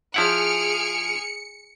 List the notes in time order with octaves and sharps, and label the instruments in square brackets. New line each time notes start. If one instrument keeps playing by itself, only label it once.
[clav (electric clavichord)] F3 E4 F#5 [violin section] G#4 F6 D7 [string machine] C#7